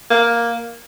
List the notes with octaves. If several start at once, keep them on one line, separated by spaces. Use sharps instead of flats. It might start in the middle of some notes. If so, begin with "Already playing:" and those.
A#3